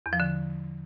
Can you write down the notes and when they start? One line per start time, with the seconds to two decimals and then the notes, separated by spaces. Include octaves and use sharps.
0.06 E2
0.13 F3
0.20 D3